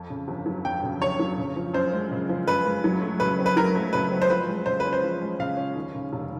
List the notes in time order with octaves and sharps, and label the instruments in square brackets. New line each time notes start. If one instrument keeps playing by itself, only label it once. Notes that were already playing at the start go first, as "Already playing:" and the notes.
Already playing: [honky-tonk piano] F2
C#3
G1
F#3
[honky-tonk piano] F2 [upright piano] G5
[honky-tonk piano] C#3
[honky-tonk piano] G1 [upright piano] C#5
[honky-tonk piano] F#3
C#3
F3
[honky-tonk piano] F#2 [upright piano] C5
[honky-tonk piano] G#3
C#3
F3
[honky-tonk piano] F#2 [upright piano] B4
[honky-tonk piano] G#3
F#3
A3
[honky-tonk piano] C#3 [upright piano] B4
[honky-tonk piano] C4
[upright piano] B4
[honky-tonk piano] F#3 [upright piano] A#4
[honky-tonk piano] A3
[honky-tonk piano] C#3 [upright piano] B4
[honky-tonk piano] C4
[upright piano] C5
[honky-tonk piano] F3 [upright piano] B4
[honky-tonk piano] G#3
[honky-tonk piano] C#3 [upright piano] C5
[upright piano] B4
[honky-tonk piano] C#4
[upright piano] C5
[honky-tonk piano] F3
G#3
[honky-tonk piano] C#3 [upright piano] F5
[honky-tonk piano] C#4
D#2
C#3
F1